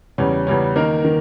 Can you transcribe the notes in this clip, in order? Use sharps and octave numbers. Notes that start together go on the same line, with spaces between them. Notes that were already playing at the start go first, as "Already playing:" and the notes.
E2 C#3 G3 C#4
E2 C#3 G3 C#4
D#3 A#3 D#4 A#4
D#3